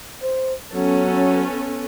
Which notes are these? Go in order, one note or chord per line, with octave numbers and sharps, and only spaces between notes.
C5
F#3 B3 C#4 A4